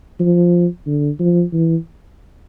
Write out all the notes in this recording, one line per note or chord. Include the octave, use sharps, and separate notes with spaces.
F3
D3
F3
E3